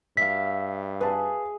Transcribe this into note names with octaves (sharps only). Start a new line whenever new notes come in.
G2 E5 F5 B6
G#4 B4 A5